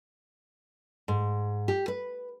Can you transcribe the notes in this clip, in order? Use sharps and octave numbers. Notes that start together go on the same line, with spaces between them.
G#2
G4
B4